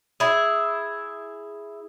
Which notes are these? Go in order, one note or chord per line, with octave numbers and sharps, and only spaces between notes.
E4 G#4